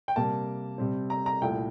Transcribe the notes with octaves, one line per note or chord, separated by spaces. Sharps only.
G5
C3 G3 A#3 A5
C3 G3 C4
A#5
A#5
C2 A#2 A3 E4 G5